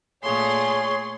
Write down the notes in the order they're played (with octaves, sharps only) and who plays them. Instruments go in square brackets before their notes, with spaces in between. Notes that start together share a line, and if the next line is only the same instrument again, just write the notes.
[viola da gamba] A#2 A3 [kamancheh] G#4 C6 [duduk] C#5